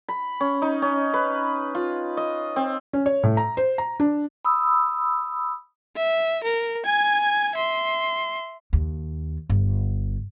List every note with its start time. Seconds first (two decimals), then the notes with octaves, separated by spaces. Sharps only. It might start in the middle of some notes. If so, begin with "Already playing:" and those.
0.09 B5
0.40 C#4
0.62 D#4
0.82 C#4
1.13 B4
1.75 F4
2.17 D#5
2.56 C4
2.93 C#4
3.06 C#5
3.23 A2
3.37 A#5
3.57 C5
3.78 A#5
4.00 D4
4.45 B5 D#6 E6
5.97 E5
6.44 A#4
6.85 G#5 G#6
7.55 E5 C6
8.73 D#2
9.50 G1